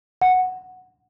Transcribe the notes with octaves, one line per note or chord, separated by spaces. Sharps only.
F#5